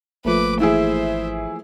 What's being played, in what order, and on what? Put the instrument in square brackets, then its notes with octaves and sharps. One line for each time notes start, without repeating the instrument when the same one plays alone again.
[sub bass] G#1 [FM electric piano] F3 A3 A#3 [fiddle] B4 D6
[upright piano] E3 E4 G#4 [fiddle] C5 E5